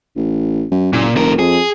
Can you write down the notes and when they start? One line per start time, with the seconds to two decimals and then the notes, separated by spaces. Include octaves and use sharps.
0.16 A1
0.71 F#2
0.93 F#1 A#2
1.16 F1 D3 A#4
1.39 F2 G#4